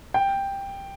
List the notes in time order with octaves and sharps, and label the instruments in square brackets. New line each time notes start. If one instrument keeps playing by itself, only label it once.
[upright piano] G5